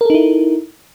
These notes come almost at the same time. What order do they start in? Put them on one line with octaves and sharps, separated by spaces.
A#4 A4 D#4 E4